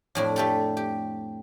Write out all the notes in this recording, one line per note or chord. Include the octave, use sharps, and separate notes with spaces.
F2 A2 D4
A3 G4 A4
G4